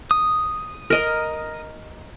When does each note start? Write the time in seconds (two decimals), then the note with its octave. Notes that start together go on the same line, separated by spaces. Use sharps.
0.11 D#6
0.90 A#4 D#5